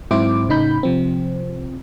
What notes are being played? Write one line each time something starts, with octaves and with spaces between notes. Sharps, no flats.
G#2 F#3 C4 E4 C5 D6
A2 C#3 D#4 B5 G6
C3 F3 C4